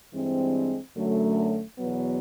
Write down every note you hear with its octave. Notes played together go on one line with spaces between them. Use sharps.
G2 E3 G#3 C4
F#2 D3 F#3 A3
E2 B2 F#3 B3